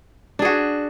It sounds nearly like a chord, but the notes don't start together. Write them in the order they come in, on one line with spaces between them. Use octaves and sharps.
D4 G#4 F#4